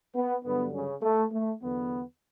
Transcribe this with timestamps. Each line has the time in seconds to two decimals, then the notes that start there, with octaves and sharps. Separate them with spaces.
0.15 B3
0.44 G2 D3 F#3 B3
0.73 C#3 C#4
1.02 A3
1.32 A3
1.61 E2 D3 F#3 B3